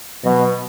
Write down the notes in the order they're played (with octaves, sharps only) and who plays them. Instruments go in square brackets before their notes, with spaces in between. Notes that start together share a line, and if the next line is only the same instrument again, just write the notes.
[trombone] B2 [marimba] F#3